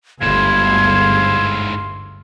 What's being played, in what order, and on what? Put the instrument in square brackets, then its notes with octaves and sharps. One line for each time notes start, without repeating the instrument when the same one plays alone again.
[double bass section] G1 D2 [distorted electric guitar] G#2 E4 [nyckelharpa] F5 C6 [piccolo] G#6